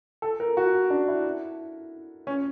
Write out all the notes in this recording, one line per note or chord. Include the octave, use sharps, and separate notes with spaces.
A4
A#4
F#4
D4
E4
C#4